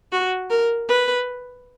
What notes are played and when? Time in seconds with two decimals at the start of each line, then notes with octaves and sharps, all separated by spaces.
0.12 F#4
0.50 A#4
0.89 B4